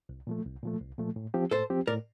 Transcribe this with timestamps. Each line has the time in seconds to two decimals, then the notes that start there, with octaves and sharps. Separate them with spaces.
0.09 C2
0.27 A#2 F3 A3
0.45 C2
0.63 A#2 F3 A3
0.81 C2
0.98 A#2 F3 A3
1.16 A2
1.34 F3 C4 G4
1.51 A2 A4 C5
1.70 F3 C4 G4
1.87 A2 A#4 D5